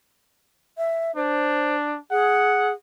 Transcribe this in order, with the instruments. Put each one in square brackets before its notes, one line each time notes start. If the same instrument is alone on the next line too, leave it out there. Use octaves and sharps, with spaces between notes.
[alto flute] E5
[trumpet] D4 [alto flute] C5
[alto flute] G#4 [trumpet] F#5